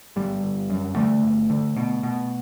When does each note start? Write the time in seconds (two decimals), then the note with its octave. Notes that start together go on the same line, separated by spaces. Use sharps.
0.16 G1 G3
0.43 G1
0.70 F#2
0.96 D3 A3
1.23 G1
1.50 D3
1.76 B2
2.03 B2